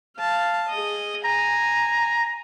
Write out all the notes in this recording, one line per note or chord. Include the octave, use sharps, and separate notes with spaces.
F5 A5
G#4 D#5
G#5 A#5